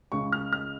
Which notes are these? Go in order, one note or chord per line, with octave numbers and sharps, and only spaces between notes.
C#2 C#3 G#3 C#6
F6
F6